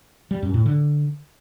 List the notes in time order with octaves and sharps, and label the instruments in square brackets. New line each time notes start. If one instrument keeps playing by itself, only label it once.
[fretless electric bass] G3
F#2
A2
D3